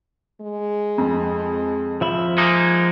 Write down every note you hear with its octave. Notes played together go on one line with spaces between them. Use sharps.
G#3
F2
F3 E5 B5
G#3 A#3 D#4